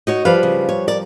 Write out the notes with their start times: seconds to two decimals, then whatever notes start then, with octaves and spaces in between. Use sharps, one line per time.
0.07 D#4 F#4 C#5
0.25 F3 G3 B4 F5
0.43 C#3
0.69 C#5
0.88 A#4 D5